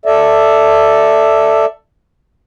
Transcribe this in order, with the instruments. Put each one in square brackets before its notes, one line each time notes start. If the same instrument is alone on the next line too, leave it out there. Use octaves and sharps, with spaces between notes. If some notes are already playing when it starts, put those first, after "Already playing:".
[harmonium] A4 D5 E5